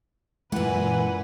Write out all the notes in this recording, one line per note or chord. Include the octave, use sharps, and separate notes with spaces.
F#2 A#2 E3 G#3 B4 F#5 G#5